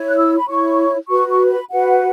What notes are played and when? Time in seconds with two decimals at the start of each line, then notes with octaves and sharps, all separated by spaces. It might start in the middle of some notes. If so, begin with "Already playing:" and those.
Already playing: E4 C#5
0.09 F#6
0.17 E6
0.37 B5
0.47 E4 C#5 C#6
1.09 F#4 B4 C#6
1.29 C#6
1.50 B5
1.70 F#4 B4 F#5